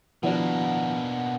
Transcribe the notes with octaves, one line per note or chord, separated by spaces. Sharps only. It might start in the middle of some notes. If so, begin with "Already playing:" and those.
B2 D#3 F3 A#3 B3 D4 E4 F#4